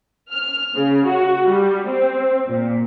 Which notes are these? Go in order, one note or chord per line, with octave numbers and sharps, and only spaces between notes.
F6
C#3
F#4
G3
C4
A#2